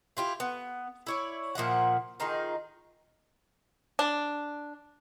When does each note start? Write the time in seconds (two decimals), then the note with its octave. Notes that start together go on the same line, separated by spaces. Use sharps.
0.17 E4 F4 G4
0.40 B3
1.07 E4 C#5 D5
1.55 A#2 F3 E5 F#5
2.20 D#3 D#4 F4 G#4
3.99 D4